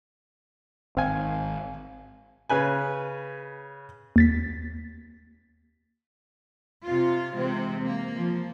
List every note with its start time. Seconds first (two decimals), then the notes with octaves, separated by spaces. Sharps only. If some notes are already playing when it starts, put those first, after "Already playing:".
0.97 G#1 C4 F5 G#5
2.50 C#3 B4 G#5
4.16 D#2 A6 B6
6.85 C3 F4
7.35 C3 E3 G#3 C4
7.83 A#3
8.16 F3